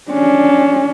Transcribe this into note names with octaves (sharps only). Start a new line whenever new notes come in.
C#4 D4